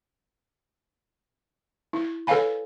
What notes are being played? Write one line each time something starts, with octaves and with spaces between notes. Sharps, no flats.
E4
A4 B4 C#5 F5 G#5 B5